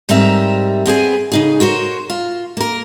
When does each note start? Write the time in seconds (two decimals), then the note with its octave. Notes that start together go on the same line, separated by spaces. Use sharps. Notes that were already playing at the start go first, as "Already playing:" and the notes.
0.09 G#2 G3 C4 A#4 E5 A#5
0.86 B3 C4 G#4 G#5
1.32 C#3 D#4 G#4
1.60 F#4 A#4 C5 C#5
2.10 F4
2.57 A#3 A#4